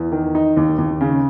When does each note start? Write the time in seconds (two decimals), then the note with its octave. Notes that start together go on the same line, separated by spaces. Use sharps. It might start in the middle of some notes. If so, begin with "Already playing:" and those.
Already playing: E2
0.12 D#3
0.35 D#4
0.57 D#2
0.78 D#2
1.01 C#3